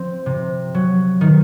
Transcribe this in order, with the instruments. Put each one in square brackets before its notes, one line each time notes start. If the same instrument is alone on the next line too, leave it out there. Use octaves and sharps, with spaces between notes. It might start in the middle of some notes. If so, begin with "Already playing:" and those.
Already playing: [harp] F3 C4
C3
F#3
D#3